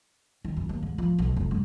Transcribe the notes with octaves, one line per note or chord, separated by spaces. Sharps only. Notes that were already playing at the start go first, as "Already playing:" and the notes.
D#3
F#2
D#2
G#2
F3
B1
F1
G2